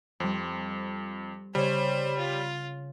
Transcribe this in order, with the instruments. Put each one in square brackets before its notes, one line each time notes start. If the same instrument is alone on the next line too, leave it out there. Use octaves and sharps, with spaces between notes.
[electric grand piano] F2 [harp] G3 C4
[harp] C#3 C#5 [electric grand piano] G3 [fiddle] C5
[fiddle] F4